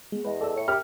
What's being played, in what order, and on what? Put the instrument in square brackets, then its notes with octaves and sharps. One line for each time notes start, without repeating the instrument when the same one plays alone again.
[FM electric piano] G#3 [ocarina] B3
[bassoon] E2 [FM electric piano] B4 [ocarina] D#5
[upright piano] A4 [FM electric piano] D5 E6
[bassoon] A2 [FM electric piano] C#5 C#7 [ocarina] E5
[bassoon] G4 [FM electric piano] A#4 [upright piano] F6